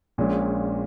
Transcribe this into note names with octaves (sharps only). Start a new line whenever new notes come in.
A#1 A#2 G#3 C#4